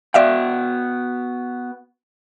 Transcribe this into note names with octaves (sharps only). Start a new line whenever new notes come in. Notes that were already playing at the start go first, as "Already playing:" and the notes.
B3 F#4 D5 E5 F5 G5